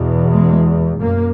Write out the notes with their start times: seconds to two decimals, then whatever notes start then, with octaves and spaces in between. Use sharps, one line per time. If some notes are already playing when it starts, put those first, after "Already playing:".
Already playing: E2 B2
0.32 G#3
1.00 F#2 A#3